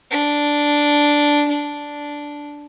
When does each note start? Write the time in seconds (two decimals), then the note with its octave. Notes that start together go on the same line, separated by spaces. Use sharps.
0.11 D4
1.49 D4